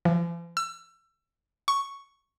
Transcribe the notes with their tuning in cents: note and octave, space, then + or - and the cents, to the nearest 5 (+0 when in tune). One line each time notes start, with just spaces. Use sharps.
F3 -45
E6 +25
C#6 +0